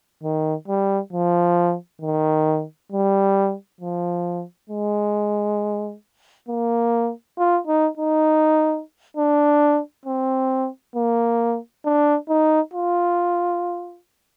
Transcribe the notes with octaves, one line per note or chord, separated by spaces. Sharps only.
D#3
G3
F3
D#3
G3
F3
G#3
A#3
F4
D#4
D#4
D4
C4
A#3
D4
D#4
F4